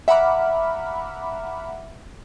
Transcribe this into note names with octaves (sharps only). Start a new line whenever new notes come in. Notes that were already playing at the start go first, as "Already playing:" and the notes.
E5 F#5 A#5 B5 D6 F6